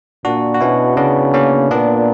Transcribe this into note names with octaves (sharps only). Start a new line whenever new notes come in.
A#2 D4 F#4
F#4
B2 C#4 E4
C#3 B3 D4
A#3 C#4
A#2 B3 D4